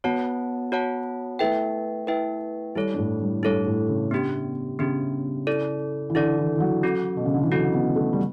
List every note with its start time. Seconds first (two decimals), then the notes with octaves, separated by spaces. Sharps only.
0.04 B3 F#4 C#5 F#5 A5
0.72 F#4 C#5 F#5 A5
1.39 A3 E4 B4 E5 G5
2.07 E4 B4 E5 G5
2.75 G3 E4 A4 C#5
2.94 G2
2.98 A2
3.21 G2
3.43 G2 E4 A4 C#5
3.66 A2
3.88 C#3
4.11 B3 D4 G4
4.79 C#3 B3 D4 G4
5.47 E4 A4 D5
6.10 E3
6.15 D3 E4 A4 D5
6.38 E3
6.56 E3
6.60 F#3
6.83 C#4 F#4 A4
7.17 B2
7.25 C#3
7.34 D3
7.43 E3
7.51 F#3 C#4 F#4 A4
7.73 B3
7.96 A3
8.13 G3